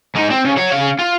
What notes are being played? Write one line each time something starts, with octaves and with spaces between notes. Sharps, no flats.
G#2 D#4
C4
C#3
C#5 F#5
C#3 F5
F4